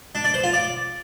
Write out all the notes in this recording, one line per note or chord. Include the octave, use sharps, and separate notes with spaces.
D4
D5
C5
F4
D5